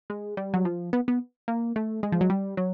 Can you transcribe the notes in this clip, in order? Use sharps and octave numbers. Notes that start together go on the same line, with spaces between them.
G#3
G3
F#3
F3
B3
B3
A#3
A3
G#3
F3
F#3
G3
F#3